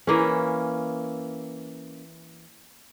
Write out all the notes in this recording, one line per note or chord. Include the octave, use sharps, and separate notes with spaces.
E3 A#3 C#4